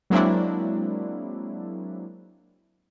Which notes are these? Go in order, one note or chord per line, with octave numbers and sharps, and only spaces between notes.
F#3 G#3 A#3 C4 D4 E4